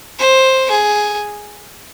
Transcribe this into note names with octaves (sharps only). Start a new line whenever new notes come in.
C5
G#4